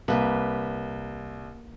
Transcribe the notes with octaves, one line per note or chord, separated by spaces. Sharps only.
C2 A#3 B4